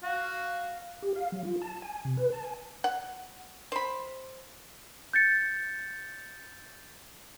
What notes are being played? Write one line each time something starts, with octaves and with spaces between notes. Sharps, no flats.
F#4 F5
G4
F5
F#3
F4
A5
G#5
C3
B4
A5
G#5
F#5
C5 B5
G6 A6 C#7